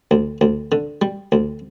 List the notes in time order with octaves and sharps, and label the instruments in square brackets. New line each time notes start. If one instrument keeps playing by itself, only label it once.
[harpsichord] D2
D2
D3
G3
D2